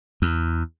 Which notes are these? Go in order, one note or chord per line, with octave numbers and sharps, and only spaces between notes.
E2